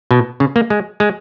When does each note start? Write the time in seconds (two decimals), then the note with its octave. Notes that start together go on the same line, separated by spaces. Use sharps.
0.11 B2
0.40 C#3
0.56 A#3
0.70 G#3
1.00 G#3